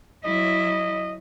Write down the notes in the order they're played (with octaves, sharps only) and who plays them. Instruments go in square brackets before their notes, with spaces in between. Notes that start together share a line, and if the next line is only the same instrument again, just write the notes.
[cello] F#3 E4 [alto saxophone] D#5